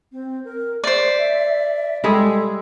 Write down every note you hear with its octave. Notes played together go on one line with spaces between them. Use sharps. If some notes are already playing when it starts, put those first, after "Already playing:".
C4
A#4
C5 D5 E5
G3 G#3 G#4 A4